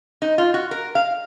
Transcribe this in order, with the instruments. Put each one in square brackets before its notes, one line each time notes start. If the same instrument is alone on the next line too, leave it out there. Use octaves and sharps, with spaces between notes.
[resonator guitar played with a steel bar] D#4
F4
F#4
A#4
F5